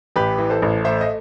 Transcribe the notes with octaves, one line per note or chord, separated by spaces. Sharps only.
A1 G4 B4
E3
A4 C5
A1
A3 C5 E5
D#5